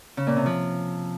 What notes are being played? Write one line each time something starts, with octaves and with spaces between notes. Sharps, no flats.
C#3
A#2
C3
F3